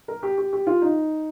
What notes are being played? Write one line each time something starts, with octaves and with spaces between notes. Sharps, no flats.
A#4
G4
G4
G4
F4
D#4